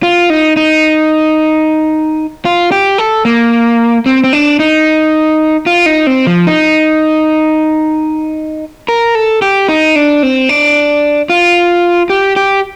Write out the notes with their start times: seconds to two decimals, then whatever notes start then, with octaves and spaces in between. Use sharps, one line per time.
0.03 F4
0.30 D#4
0.57 D#4
2.45 F4
2.72 G4
2.98 A4
3.25 A#3
4.06 C4
4.24 C4
4.33 D4
4.59 D#4
5.66 F4
5.86 D#4
6.07 C4
6.27 F3
6.47 D#4
8.88 A#4
9.15 A4
9.42 G4
9.69 D#4
9.96 D4
10.23 C4
10.49 D4
11.30 F4
12.10 G4
12.36 G4